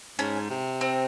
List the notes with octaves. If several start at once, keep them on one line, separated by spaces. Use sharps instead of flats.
G#2 C#4
C3
C4